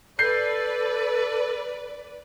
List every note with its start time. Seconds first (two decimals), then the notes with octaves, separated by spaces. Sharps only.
0.19 A4 B4 D5 G6 C7